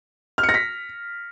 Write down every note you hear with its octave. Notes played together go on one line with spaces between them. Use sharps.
F6
C#7
A#6
B6